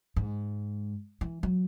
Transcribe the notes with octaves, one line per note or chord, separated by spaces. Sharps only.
G#2
E3
F#3